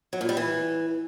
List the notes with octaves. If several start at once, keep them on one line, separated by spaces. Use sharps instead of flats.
F#3
A#2
G3
E3